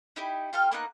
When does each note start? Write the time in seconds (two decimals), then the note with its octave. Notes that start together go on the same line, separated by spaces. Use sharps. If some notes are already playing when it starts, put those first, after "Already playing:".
0.16 D#4 E4 G4
0.53 F4 A4 G5 F6
0.72 A#3 B3 D#4 F#6